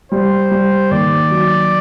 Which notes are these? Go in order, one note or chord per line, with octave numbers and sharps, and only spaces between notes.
G3 C5
G3
D#2 D5
F#3